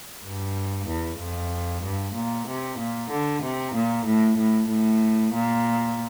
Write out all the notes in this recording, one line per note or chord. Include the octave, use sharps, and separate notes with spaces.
G2
E2
F2
G2
A#2
C3
A#2
D3
C3
A#2
A2
A2
A2
A#2